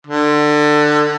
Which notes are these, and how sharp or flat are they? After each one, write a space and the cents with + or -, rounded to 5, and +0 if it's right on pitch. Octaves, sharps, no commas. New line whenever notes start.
D3 +20